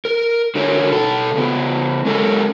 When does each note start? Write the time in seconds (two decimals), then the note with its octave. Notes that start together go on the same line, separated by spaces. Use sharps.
0.05 A#4
0.55 D3 F#4 A#4 C#5
0.92 B2 A4
1.36 C#3 B3
2.05 G#3 C#4 A4 A#4